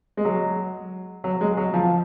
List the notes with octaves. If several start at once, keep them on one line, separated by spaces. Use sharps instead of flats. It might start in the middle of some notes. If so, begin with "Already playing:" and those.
G#3
F#3
F#3
G#3
F#3
F3